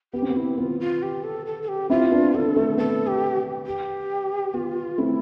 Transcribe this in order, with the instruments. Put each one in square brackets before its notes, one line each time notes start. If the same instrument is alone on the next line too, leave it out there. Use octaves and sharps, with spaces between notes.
[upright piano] B3 [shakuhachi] G4
[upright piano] C4
B3
[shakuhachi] E4
[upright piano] B3 [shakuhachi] F4
[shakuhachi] F4
G4
A4
A4
A4
G4
[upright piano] C4 E4 [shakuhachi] F4
[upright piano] B3 D4
[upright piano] B3 D4 [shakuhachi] A4
[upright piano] A3 C4
[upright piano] B3 [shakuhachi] A4
[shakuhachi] G4
G4
[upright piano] B3 [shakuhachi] F4
[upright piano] A3 C4 [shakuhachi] E4